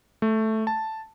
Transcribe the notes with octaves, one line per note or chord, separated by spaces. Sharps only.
A3
A5